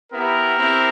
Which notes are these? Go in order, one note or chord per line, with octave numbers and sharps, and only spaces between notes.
B3 E4 G4 A#4
C4 E4 G4